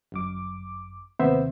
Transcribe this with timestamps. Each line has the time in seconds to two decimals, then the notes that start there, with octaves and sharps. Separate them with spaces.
0.12 G1 F#2 D6
1.19 D#2 C3 B3 C5 E5